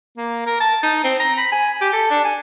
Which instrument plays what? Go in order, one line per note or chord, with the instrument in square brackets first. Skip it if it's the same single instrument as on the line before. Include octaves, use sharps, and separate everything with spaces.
[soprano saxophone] A#3
A#4
A5
D#4
C4
A#5
B5
G#5
G4
A4
D4
G#5